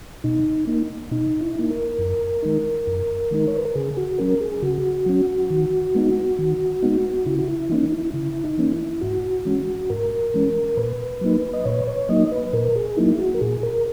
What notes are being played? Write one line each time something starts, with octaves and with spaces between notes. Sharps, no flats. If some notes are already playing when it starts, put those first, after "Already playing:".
B2 D#4
A#3 D#4
B2 D#4
E4
A#3 D#4
A#4
F#2
D#3 G#3 D#4
F#2
D#3 G#3 D#4
C#5
B4
A#4
C#3 G#4
F#4
F#3 C#4 A#4
G#4
C#3 F#4
F#3 C#4
D#3
G#3 B3 D#4
D#3
G#3 B3 D#4
C#3 E4
F#4
E4
E3 A#3 C#4 D#4
E4
C#3 E4
D#4
E3 A#3 C#4
E4
G#2 F#4
E3 G#3 C#4
G#2 A#4
E3 G#3 C#4
A#2 B4
F#3 A#3 D#4
D#5
A#2 C#5
B4
C#5
F#3 A#3 D#4 D#5
B4
A#2 A#4
G#4
F#3 A#3 D#4 E4
F#4
A#4
A#2 G#4
A#4